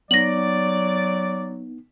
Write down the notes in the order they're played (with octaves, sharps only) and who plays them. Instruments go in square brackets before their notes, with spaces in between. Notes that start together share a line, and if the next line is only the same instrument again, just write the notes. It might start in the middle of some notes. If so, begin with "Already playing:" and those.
[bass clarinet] F#3 [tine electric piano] B3 D#4 [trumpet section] D5 [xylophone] A#6 F#7